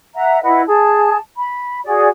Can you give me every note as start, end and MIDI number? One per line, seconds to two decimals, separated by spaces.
0.15 0.41 76
0.15 0.41 78
0.15 0.41 82
0.43 0.63 64
0.43 0.63 71
0.43 0.63 75
0.43 0.63 78
0.67 1.17 68
0.67 1.17 81
1.37 1.80 83
1.85 2.09 66
1.85 2.09 68
1.85 2.09 74